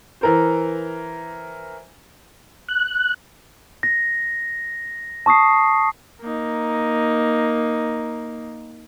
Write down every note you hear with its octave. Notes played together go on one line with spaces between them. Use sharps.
E3 A#4 C5
F#6
A#6
A5 C#6 D#6 C7
A#3 D#4